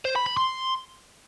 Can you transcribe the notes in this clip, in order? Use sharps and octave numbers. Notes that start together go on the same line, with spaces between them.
C5
B5
B5
C6